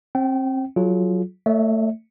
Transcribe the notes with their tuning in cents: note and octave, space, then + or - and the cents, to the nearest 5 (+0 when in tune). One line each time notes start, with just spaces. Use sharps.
C4 +30 G5 -30
F#3 +0 F4 +0 G#4 +45
A3 +20 C#5 +35 E5 -35